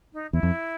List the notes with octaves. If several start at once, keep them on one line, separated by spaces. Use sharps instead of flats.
D#4
E2 E4
F2